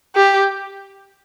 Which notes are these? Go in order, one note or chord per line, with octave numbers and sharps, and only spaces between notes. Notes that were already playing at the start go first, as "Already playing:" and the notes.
G4